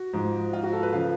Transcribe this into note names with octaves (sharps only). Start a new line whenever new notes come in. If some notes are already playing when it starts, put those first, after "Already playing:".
Already playing: F#4
G#2 F3
F4
F#4
A4
B4
C#3 F3 F5